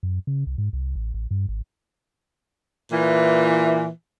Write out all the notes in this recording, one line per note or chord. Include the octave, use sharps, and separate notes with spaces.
F#2
C#3
C2
G#2
C2
A1
A1
G2
G#1
A#2 E3